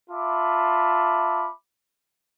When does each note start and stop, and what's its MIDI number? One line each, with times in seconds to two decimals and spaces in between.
0.10 1.50 65
0.10 1.50 76
0.10 1.50 81
0.10 1.50 83
0.10 1.50 86